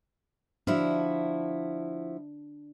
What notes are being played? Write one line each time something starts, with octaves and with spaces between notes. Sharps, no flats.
F3 D4 E4 F#4